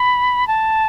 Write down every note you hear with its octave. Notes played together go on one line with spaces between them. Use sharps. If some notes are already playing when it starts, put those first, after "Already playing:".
Already playing: B5
A5